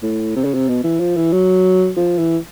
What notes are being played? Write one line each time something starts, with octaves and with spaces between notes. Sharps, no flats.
A2
C3
C#3
C3
B2
E3
F3
E3
F#3
F3
E3